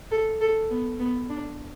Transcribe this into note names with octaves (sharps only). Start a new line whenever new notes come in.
A4
A4
B3
B3
D4